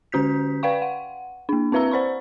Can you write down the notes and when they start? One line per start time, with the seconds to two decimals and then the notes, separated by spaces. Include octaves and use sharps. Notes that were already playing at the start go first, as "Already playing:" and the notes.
0.12 D3 C#4 F#4 G6 B6
0.63 B4 D5 F5 G5 C#6
0.82 F#5
1.49 A#3 D4
1.72 C4 E4 B4 E5 A#5 E6
1.91 C5 D5 B5 C#6